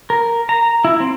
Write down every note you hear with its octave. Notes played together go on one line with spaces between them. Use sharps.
A#4
A#5
E4
C4